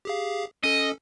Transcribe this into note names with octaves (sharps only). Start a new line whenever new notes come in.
G4 G#4 F5
C#4 A4 D#5